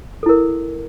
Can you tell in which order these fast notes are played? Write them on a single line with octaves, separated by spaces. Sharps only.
A4 E4 A#4